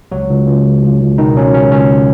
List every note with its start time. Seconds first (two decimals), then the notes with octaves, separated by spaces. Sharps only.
0.12 C#2 F#3 F#4
0.30 C#2
0.47 C#2
0.66 C#2
0.83 C#2
1.01 C#2
1.18 B2 D#3 D#4
1.37 F#3 C#4
1.54 C#2 C#4
1.72 C#2 C#4